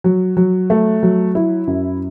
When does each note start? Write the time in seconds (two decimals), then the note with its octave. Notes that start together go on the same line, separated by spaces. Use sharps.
0.04 F#3
0.37 F#3
0.70 A3
1.03 F#3
1.35 E4
1.67 F#2